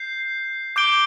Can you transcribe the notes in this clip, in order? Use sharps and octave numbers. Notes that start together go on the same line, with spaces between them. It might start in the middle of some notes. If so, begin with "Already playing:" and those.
Already playing: G6 C7
D6 G6 D7 G7